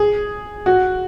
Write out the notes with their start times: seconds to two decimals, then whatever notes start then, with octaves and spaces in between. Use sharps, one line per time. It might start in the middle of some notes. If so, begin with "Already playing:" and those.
Already playing: G#4
0.66 F#4